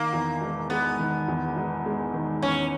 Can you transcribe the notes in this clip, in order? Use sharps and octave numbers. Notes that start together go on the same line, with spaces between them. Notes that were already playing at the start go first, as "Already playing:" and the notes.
Already playing: D#3 A#3
E2
E1
G#3 B3
D#3
E2
E1
G#3
D#3
E2 C#4